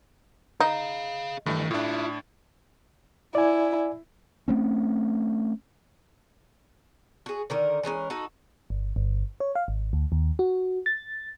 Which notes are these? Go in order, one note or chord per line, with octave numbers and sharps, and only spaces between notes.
D#4 G#4 F5
G2 D#3 E3 A3
A2 D4 E4 F4
E4 D5 G#5
A3 C4 C#4
F#4 G#4
D3 D#3 A#4
E3 G#3 C#4 A#4
D#4 F#4 A4
G1
G1
C#5
F5
G#1
D2
D#2
F#4
A6